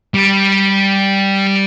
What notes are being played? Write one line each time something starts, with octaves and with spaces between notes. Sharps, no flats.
G3